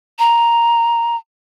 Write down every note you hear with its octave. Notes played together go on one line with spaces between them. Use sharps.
A#5